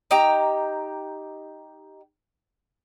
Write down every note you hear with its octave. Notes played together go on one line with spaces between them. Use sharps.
D#4 G4 G5 A#5